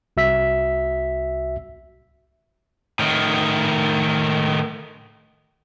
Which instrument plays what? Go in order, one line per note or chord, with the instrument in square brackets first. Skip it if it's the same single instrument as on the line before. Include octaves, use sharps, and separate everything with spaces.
[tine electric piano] C2 F#4 E5 E6 B6
[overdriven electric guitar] A2 D#3